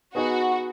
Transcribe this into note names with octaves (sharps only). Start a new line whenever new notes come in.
B3 D#4 F#4 G#4 B4